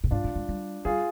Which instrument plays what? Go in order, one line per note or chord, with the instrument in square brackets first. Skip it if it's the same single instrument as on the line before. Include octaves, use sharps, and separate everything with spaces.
[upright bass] A#2
[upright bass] G#2 [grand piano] D4 F4
[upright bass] G#2
G#2
G3
[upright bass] G3 [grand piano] F4 G#4